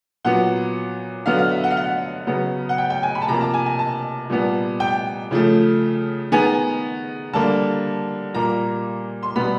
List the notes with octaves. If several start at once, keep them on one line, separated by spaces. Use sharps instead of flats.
A#2 F#3 B3 F#5
D3 F#3 B3 F5
F5
E5
F#5
F5
F#5
C#3 F#3 B3
F#5
G5
G5
G#5
B5
A5
C3 F3 A#3 A#5
A5
G#5
G#5
A5
A#2 G3 B3
G5
C#3 F3 A3
D#3 G#3 B3 G#5
D3 G3 A#3 A5
A#2 G3 A#3 A#5
C6
B2 G3 B3 B5